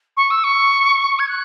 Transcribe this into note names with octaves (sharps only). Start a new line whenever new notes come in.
C#6
E6
C#6
G#6
F#6